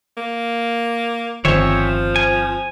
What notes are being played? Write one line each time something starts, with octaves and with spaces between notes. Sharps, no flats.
A#3
G1 D#3 F3 C4 C#5 E5 G#5
G#5